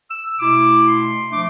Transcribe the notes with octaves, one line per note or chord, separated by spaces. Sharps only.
E6
B2 A3 E4 D6
C6
F3 A3 D4 D6